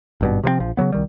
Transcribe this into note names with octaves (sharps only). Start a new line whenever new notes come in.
G#1 G2 B2
C3 F3 F#3 C4
A#1 F3
C#3 E3 F#3 B3
C2 D#3 G3